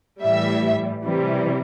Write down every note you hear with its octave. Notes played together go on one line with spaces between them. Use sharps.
A2 E3 G3 E5
C3 E3 G3